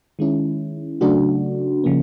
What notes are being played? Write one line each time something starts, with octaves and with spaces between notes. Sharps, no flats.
D#3 G#3 C#4 E4
C#3 F#3 A3 D4 F#4
C#3 F3 A#3